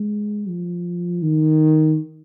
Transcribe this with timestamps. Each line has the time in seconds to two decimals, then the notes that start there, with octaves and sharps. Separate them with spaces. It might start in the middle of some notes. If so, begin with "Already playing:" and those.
Already playing: G#3
0.49 F3
1.23 D#3